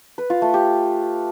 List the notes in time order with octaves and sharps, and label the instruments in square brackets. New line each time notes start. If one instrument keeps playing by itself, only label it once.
[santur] B4
F4
A3
G4